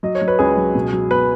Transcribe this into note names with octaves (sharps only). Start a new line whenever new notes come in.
F#3 D#5
C#5
F#3
B4
C#2 G#4
F#3
B2
F#3
B3 B4